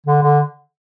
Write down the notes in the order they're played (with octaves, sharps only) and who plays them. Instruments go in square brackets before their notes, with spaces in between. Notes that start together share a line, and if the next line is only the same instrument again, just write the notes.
[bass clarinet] D3
D3